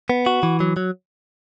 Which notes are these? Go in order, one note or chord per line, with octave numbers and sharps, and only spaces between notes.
B3
F#4
E3
F#3
F#3